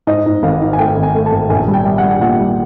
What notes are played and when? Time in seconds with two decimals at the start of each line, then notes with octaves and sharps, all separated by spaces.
0.07 G#2 D#5
0.26 G#2
0.43 G#1 F5
0.62 G#2
0.73 G#5
0.78 A3 G5
0.97 G#1
1.03 G#5
1.14 A3
1.26 A5
1.32 G#1
1.50 A#1 G#5
1.68 G3
1.74 G5
1.86 G3
1.98 G3 F#5
2.21 A#2 F#5
2.39 G3